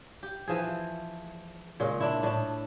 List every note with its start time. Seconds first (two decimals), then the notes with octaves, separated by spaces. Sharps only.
0.23 G4
0.48 E3 F3 G#4
1.80 A#2 C#3 G#3
2.00 D4 E4
2.23 A2 D4